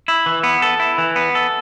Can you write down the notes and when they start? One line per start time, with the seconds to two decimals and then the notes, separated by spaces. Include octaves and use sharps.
0.08 E4
0.26 E3
0.43 B3
0.62 A4
0.80 E4
0.98 E3
1.16 B3
1.35 A4